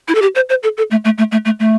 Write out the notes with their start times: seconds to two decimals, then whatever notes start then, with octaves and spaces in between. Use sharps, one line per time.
0.08 E4
0.15 A4
0.22 G4
0.35 C5
0.50 C5
0.63 A4
0.77 A4
0.91 A3
1.05 A3
1.18 A3
1.32 A3
1.45 A3
1.60 A3